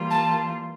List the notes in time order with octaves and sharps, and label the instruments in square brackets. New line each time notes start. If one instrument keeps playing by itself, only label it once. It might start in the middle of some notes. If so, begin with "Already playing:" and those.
Already playing: [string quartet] E3 G3 A#3 F4
[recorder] A5